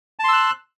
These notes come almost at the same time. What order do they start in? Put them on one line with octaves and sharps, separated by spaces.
A5 C6 E6 F#6